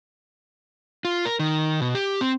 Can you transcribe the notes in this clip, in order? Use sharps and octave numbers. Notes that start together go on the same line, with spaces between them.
F4
A#4
D#3
B2
G4
C4